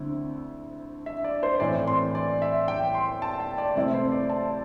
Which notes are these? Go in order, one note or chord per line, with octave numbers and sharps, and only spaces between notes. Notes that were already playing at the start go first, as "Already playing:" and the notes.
Already playing: D2 D3 C4 E4
E5
D5
C5
A2 E3 C4 E4 D5
C6
D5
E5
G5
C6
A5
G5
D5
C3 A3 C4 E4 D5
C5
D5
A5